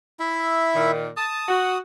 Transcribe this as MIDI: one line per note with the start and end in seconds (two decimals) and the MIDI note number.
0.20 0.91 64
0.20 0.91 76
0.75 1.08 46
0.75 1.08 51
1.17 1.44 81
1.17 1.78 87
1.48 1.77 66